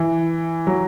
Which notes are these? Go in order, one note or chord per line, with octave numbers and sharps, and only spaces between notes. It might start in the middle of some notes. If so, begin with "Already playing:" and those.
Already playing: E3
F#3